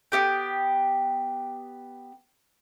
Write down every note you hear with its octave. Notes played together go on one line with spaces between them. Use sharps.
B3 C#4 G4 G5